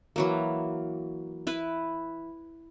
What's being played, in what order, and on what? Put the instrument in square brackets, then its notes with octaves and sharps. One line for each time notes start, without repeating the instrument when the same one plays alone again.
[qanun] E3 F#3 A#3
E4 B4